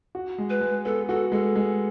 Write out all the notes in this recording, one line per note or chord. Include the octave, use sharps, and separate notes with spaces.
F#4
G#3
B4
G#3
B3 A4
F#4 A4
G#3 A4
G#3